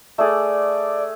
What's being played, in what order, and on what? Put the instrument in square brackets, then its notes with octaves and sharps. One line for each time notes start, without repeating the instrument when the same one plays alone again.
[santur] A3 G#4 [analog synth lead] D5